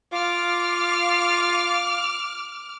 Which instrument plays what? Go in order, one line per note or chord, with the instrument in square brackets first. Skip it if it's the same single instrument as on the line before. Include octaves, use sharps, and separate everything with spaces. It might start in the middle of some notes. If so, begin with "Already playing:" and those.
[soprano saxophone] F4 [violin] D6 F6